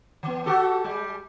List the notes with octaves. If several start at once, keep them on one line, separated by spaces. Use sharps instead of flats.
E3 B3
F#4 G4 A4
G3 G#3